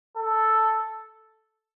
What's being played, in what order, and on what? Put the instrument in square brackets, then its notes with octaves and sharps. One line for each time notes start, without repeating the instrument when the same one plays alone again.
[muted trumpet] A4